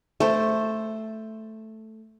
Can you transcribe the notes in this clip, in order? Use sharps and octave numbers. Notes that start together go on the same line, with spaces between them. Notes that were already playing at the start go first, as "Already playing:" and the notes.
A3 C5